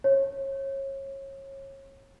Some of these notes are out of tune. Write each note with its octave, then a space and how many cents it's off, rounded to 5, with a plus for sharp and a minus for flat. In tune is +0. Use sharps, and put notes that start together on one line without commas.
C#5 -30